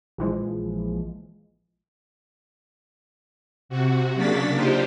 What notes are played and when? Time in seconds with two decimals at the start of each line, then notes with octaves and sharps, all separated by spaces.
0.18 A#1 E3 F3 G#3
3.69 C3 F#4
4.14 C#3 F#3 A#3 D4 A6 B6
4.54 D4 D#4 F4 G4 C5